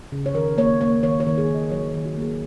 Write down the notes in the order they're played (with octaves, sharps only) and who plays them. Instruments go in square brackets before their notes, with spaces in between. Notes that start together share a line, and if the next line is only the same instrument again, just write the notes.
[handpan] C#3
C#5
D#3 A#4
A#3 C#5
A#3 C#5
D#3 C#5
C#5
D#3
G#4
D#3
D#5
F#3 C#5
C#5
D#3
F#4
A#3 G#4